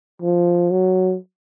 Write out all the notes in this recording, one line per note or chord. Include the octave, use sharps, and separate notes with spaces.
F3
F#3